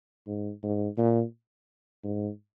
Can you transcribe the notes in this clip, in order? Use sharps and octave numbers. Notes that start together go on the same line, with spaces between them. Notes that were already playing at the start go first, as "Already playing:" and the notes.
G#2
G#2
A#2
G#2